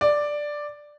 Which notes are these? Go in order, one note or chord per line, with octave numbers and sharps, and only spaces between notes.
D5